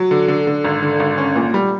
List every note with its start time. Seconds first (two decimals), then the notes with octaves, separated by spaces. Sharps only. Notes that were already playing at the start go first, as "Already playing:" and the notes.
Already playing: F#3
0.11 D3
0.28 D3
0.47 D3
0.64 G#1
0.82 D3
1.00 G#1
1.18 C#4
1.36 A#2
1.54 G3